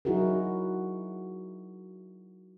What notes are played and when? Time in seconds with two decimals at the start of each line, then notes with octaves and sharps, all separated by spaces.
0.05 F#3 D#4 E4 F#4 G#4 A#4